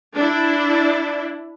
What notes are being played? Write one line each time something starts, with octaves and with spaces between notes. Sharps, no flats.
D4 E4